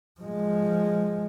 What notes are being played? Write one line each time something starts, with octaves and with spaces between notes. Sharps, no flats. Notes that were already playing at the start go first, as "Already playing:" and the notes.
F3 G#3